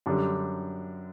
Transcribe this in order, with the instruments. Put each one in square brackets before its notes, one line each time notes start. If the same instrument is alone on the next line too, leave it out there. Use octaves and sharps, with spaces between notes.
[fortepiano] F#2 D3 G3